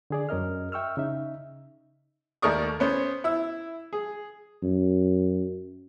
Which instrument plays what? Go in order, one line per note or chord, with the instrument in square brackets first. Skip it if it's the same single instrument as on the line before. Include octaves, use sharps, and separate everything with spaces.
[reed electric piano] D3 G#4 D5
F#2 C#4 A#4 D#5 F6
E5 G5 C#6 E6 F6
C#3 D#4 E5
[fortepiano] D#2 A3 A#4 D5 C#6 D#6
B3 C#4 C5
E4 E6
G#4
[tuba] F#2